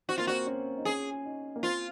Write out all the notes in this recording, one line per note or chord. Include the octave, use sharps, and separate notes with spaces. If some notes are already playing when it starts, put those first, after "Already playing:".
C4 F#4
A#3 F4
C4 F#4
C#4
D#4
C#4 G#4
D#4
A#3
C4 F4